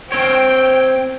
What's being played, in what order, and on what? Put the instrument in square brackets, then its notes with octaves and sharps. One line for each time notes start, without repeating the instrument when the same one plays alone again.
[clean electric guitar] C4 C#5 [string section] G5